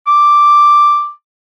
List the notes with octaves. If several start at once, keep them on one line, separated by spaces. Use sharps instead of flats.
D6